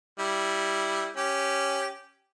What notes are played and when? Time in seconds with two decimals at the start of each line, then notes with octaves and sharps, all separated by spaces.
0.19 G3 E4
1.16 C#4 G4